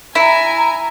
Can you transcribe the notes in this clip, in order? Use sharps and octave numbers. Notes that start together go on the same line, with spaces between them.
E4 G#5 A#5